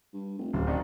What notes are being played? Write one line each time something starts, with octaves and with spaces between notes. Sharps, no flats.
G2
F1
D1 F#2
C3 D#3 D4 D#4